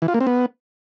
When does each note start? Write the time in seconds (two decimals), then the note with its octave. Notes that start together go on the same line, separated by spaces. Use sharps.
0.02 E3
0.08 F4
0.14 A#3
0.20 C4
0.27 B3